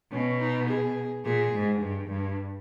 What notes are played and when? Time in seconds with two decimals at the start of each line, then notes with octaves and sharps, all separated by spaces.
0.12 B2 C#4
0.40 D#4
0.68 G#4
1.25 A#2 G#4
1.54 G#2
1.81 G2
2.09 G2